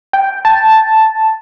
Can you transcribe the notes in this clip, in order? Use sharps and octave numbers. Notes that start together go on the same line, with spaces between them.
G5
A5